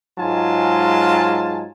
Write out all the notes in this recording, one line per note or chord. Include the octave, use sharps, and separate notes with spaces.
G#2 F#3 G#3 F4 G#5 A5